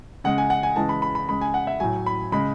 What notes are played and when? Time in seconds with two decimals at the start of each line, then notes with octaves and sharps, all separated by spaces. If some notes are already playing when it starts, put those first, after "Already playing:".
0.24 C#3 G#3 F#5
0.38 G#5
0.50 F#5
0.63 G#5
0.76 C#3 E3 G#3 A5
0.89 B5
1.02 B5
1.15 B5
1.28 C#3 G#3 B5
1.41 G#5
1.54 F#5
1.67 E5
1.80 A2 F#3 G#5
2.06 B5
2.32 C#3 G#3 B5